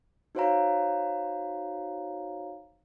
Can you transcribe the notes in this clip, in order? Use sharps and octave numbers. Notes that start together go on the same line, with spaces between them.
D#4 F#4 C5 C#5 F5 A#5